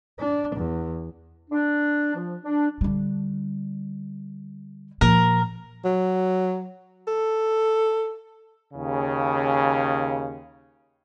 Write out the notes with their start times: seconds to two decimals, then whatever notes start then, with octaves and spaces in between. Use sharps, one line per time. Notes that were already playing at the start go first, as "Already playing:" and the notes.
0.19 D4
0.56 E2
1.51 D4
2.15 F3
2.44 D4
2.81 D3 G3
5.01 A#2 F3 A#4
5.85 F#3
7.07 A4
8.74 D#2 C#3